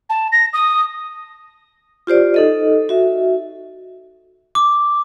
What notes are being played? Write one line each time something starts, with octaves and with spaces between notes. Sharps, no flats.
A5
A#6
D#6
F4 G4 C5 D5
D#4 A4 D#5
F#4 E5
D6